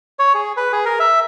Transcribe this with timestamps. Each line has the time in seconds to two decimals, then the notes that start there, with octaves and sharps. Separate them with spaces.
0.19 C#5
0.34 G#4
0.57 B4
0.73 G#4
0.85 A#4
1.00 E5